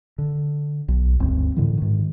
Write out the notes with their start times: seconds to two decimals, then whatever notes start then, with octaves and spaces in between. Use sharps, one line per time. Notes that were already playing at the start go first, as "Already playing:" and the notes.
0.18 D3
0.88 B1
1.20 F#1 D2 G2 C4
1.56 A2 D3 E3
1.78 G#2 D#3